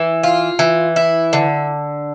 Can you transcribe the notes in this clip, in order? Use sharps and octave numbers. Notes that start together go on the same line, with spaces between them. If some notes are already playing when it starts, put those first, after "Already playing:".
Already playing: E3
F4
E3
E4
D3